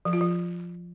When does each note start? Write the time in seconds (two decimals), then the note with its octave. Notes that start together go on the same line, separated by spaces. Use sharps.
0.05 F3
0.13 F4
0.21 F3